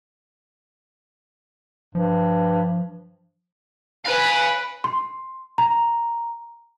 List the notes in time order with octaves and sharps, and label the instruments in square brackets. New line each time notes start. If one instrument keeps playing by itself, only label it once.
[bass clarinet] G2 [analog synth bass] F3
[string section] B4 [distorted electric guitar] F5 G#5
[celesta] C6
A#5